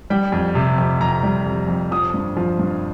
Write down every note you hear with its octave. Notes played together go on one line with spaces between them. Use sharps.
G3 G5
F2
C3
F2
F2 A#5
G3
F2
F2
F3 D#6
G2
F3
G2